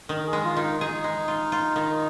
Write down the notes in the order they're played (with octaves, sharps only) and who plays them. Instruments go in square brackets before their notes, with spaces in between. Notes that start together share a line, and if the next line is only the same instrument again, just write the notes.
[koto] D#3 [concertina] A#4
[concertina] G#4
[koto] G#3
[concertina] F4
[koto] D#3
[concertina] D#4
[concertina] D#4 [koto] G#4
[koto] G#3
F4
F4
D#3